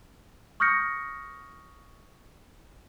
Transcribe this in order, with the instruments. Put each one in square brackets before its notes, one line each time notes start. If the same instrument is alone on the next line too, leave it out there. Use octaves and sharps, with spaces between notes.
[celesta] C#6 D#6 F6 G6 A#6 C#7